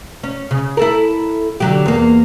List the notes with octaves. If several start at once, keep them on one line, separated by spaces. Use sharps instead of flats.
C#4
C#3
E4 A4 A#4
D3 F#3 G4
E2 A#3